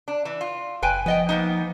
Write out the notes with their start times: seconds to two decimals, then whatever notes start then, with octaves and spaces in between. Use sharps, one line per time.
0.08 D4
0.25 E3
0.41 F4
0.82 F#1 B4 G5 G#5
1.06 F3 B3 D#5 G5
1.29 A#3 B3 D#4